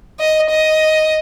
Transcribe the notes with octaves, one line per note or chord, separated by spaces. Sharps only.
D#5
D#5